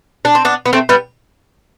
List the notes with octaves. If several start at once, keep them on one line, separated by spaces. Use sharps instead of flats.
D4
C4
B3 D4
B3
A3 C4
G3 B3